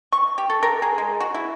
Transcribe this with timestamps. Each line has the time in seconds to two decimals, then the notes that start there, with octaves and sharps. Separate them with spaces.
0.12 C#6
0.38 G4
0.50 A4
0.63 A#4
0.82 G#4
0.98 G#3
1.20 F#4
1.34 E4